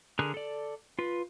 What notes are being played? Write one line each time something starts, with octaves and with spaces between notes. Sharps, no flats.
D3 G#4 A#4 F#6
A4 D5
F4 B4